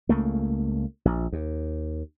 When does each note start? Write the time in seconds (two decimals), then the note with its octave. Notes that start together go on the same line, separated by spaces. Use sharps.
0.09 C#2 A3 A#3
1.05 A#1
1.32 D#2